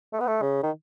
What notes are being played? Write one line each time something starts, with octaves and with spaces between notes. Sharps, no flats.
A3
B3
A3
C#3
D#3